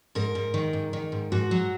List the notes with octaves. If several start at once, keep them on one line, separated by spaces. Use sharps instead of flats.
G#2 A#4
G#2
D#3
G#2
D#3
G#2
G#2 F#4
F#3